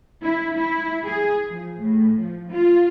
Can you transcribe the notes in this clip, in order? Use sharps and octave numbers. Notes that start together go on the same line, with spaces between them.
E4
E4
G#4
F3
A2
F3
F4